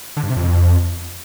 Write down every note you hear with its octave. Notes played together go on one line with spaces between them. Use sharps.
D3
G2
C3
F2